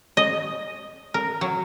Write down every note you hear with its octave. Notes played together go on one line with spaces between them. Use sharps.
D#5
A#4
F#3